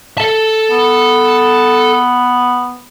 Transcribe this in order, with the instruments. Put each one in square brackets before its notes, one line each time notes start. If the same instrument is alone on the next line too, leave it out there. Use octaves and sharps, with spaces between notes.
[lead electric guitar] A4 A5
[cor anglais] B3